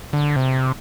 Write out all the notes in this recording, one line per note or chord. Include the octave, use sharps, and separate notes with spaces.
D3
C3